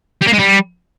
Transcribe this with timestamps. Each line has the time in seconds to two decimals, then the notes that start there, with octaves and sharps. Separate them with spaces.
0.22 G3
0.28 A#3
0.34 G#3
0.40 G3